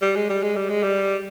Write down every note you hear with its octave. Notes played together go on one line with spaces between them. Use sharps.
G3
G#3
G3
G#3
G3
G#3
G3